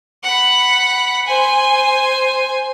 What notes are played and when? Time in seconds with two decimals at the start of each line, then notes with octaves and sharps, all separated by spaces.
0.23 F#5 B5
1.26 C5 G#5